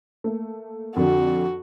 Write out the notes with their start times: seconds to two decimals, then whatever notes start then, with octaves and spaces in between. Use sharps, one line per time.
0.24 A3 A#3
0.96 F2 D3 F#4